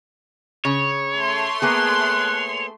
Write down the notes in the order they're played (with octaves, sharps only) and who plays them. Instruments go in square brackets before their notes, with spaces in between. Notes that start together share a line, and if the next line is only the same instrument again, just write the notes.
[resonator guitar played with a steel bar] C#3 [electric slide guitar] C#5
[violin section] A3 C6
[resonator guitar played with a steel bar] A#3 B3 G#4 [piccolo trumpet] F#6